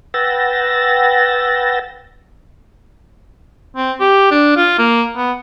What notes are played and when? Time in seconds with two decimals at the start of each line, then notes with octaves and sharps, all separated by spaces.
0.14 B4 F#5 G5 E6 A6 A#6
3.76 C4
4.00 G4
4.31 D4
4.57 F4
4.78 A#3
5.16 B3